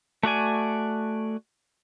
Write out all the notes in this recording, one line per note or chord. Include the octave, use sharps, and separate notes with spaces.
A3 F#4 D5 G#5